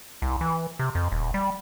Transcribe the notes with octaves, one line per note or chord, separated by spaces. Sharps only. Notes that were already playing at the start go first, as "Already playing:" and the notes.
C2
E3
C3
F2
D#1
G3